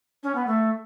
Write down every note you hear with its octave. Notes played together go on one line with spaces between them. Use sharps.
C#4
B3
A3